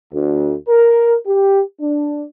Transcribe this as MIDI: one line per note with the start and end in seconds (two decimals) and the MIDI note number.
0.13 0.54 38
0.68 1.15 70
1.26 1.62 67
1.80 2.24 62